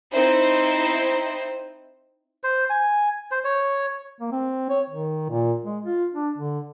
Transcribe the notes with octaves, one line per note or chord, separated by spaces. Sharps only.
C4 D#4 E4 C5
C5
G#5
C5
C#5
A#3
C4
C#5
D#3
A#2
G#3
F4
D4
D3